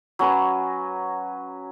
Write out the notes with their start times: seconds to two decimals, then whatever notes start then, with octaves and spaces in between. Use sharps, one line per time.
0.19 F#3 C#4 B4